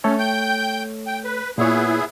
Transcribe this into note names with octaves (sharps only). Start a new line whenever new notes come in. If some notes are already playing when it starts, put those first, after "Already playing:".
A3 C#4 A4 C#5
G5 G6
G5
B4
A#2 B3 E4 G#4 C#5